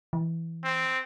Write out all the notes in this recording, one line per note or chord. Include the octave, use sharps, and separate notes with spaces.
E3
C4